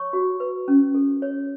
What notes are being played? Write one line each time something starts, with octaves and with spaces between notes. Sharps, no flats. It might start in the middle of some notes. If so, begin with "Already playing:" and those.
Already playing: C#5 C#6
F#4
B4
C#4
A4
C#5